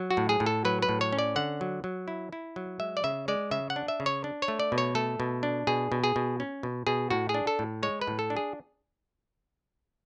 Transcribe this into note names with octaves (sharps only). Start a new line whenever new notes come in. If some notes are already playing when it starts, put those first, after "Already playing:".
Already playing: F#3
F#4
A2
G#4
A2
A4
F#3 B4
B4
A2
C#5
C#4
D5
D3 F#5
F#3
F#3
E4
E4
F#3
G#3 E5
D5
C#3 E5
G#3 D5
C#3 E5
F#5
D4
E5
C#3
C#5
D4
C#5
A3
D5
B2
C#5
A3 A4
B2
D4
B2 G#4
B2
G#4
B2
C#4
B2
B2 G#4
A2 F#4
G#4
D4
A4
A2
G#3 C#5
B4
A2
A4
D4
G#4